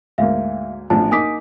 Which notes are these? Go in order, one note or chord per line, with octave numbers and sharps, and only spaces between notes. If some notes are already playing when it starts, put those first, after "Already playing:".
D2 G#2 A#3 E5 F5
A1 F3 D4 A5
A#3 D#4 G#5 D6 D#6 B6